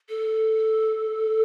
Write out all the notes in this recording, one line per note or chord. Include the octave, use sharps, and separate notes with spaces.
A4